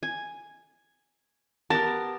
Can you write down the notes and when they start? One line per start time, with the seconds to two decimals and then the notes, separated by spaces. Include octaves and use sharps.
0.03 G#5
1.70 B3 G4 A#4 A5